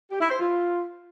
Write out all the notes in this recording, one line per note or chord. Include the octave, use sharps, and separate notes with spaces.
G4
E4
C5
F4